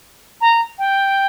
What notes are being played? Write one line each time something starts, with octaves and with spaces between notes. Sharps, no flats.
A#5
G5